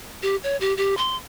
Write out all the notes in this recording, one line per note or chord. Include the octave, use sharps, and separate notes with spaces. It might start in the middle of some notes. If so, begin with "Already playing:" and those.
G4
C#5
G4
G4
C6